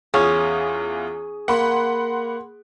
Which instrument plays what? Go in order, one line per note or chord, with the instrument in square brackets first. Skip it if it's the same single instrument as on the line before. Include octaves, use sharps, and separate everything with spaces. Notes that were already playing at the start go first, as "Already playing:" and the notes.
[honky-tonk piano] E2 F4 D#6 [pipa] C#4 [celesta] G#4
[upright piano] A#3 [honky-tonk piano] F#5 B5 C6